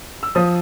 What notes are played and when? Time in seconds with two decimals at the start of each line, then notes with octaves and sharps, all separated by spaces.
0.23 E6
0.35 F3 D#6